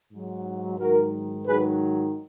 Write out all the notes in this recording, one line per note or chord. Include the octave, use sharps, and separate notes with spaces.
G#2 F#3
G#2 D#3 F#3 F#4 A#4
G#2 D#3 F#3 G#4 B4